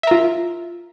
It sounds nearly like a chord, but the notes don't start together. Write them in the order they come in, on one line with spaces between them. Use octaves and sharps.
E5 A#4 F4